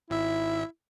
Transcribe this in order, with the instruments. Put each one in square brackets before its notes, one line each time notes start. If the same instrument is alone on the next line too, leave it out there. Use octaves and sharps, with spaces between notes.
[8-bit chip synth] G#1 E5 [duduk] E4